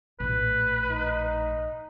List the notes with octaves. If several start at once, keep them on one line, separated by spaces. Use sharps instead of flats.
A#1 A2 B4
D#4